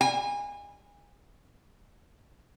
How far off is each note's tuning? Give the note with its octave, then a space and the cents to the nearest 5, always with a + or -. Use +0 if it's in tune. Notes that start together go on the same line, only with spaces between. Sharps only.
G#5 -30